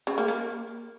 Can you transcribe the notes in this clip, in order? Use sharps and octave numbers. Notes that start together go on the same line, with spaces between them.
C#3
A#3
A#3